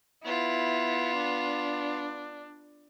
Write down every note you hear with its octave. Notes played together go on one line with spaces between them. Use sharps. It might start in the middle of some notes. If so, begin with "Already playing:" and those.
B3 E4 F4
D4